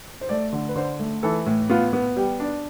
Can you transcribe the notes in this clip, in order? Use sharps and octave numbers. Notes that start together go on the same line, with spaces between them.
C5
A3 D5
D3
B4
D3 C5
A3
E3 A4
A2
B3 F4
B3
G3 G4
D4